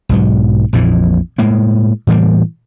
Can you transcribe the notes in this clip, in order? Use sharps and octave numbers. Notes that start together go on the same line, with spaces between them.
B1 G#2 F#3
A#1 F2 A#2 E3
A2 G#3 A#3
A2 E3 G3 A#3